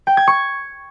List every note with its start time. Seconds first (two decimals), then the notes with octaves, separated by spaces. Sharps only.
0.07 G5
0.17 G#6
0.27 C#6